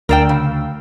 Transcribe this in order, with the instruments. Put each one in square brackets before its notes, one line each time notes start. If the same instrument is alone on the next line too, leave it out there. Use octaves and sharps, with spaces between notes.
[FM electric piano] D2 F5 E6 [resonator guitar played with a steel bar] A#4 D5 G5
[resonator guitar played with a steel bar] C#3